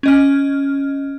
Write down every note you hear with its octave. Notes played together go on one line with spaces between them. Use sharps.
C#4 D#5 F6